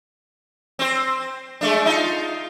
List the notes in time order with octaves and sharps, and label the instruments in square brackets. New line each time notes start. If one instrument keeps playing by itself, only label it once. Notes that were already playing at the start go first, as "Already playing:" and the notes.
[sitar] C4 C5
G#3 A3 D4
D#4 F4